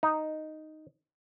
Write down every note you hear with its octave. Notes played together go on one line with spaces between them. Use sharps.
D#4